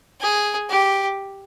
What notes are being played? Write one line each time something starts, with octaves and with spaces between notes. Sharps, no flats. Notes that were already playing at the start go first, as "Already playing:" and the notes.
G#4
G4